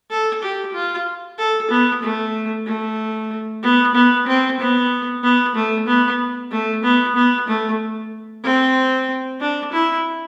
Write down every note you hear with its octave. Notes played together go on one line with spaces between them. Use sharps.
A4
G4
F4
A4
B3
A3
A3
B3
B3
C4
B3
B3
A3
B3
A3
B3
B3
A3
C4
D4
E4